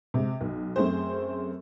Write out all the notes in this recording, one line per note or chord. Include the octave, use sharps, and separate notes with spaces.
C3 G#3
B1
F#2 A3 C4 G#4 C5